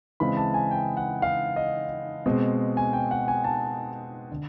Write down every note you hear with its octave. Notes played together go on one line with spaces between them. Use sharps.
C#3 E3 G#3 C4 B5
A5
G#5
G5
F#5
F5
D#5
B2 G#3 C4
G#5
G5
F#5
G#5
A5
D3